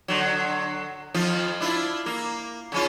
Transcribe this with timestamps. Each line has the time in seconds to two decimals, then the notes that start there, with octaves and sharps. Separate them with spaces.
0.08 D3 F#3
1.14 F2 F3 F4
1.60 D4 E4 F4
2.06 A#3
2.72 C#3 C#4 F4